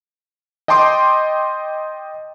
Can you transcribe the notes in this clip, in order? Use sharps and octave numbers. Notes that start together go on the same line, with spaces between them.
D#5 G5 A5 C6 D6